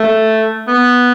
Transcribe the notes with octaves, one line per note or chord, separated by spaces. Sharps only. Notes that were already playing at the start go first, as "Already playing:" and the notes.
Already playing: A3
B3